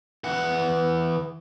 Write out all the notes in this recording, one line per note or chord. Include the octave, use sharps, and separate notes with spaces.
E3 F#5